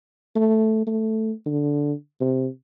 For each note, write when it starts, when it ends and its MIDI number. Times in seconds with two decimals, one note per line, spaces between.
0.36 0.83 57
0.87 1.32 57
1.46 1.93 50
2.21 2.47 48